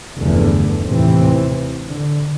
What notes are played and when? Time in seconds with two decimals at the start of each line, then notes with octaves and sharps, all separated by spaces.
0.19 F1 E2 G2 D3 A3
0.83 D#2 A2 C3 E3 C4
1.86 D3